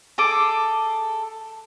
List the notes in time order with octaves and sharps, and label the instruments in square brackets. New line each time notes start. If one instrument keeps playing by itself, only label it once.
[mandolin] G#4 A4 D6